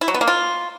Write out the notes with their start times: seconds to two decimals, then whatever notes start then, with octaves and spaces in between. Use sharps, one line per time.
0.01 E4
0.08 F#3
0.14 B3
0.21 A#3
0.27 F4